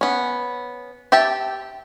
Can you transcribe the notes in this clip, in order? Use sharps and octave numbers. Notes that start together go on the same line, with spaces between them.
B3 C#4
G4 E5 G5 A5